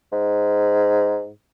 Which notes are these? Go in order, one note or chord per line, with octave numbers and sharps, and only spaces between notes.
G#2